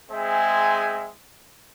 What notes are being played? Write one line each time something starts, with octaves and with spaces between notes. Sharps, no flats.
G#3 C4 G#4 C5 E5 G#5